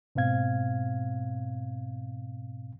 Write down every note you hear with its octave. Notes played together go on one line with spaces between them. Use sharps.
G#2 B2 C4 F5 G#6